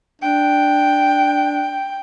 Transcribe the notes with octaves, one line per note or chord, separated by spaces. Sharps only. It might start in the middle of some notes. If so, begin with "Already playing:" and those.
D4 G5